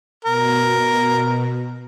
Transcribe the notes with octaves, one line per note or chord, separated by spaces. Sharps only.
B2 A#4